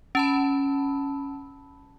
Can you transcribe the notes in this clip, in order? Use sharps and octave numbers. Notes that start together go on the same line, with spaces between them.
C#4 A5 B5